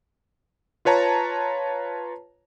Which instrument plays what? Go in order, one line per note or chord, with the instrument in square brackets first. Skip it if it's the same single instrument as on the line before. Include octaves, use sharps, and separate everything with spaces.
[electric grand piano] F4 B4 C#5 A5 A#5